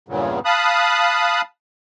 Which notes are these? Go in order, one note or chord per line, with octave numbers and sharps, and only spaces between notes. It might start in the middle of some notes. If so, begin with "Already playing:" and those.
E2 G2 A#2 C#3 F#3
F5 A5 B5 D#6 F#6